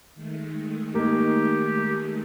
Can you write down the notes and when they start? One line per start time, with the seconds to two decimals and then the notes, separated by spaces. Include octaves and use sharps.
0.14 D#3 G#3 A3
0.95 A#3 D#4 G4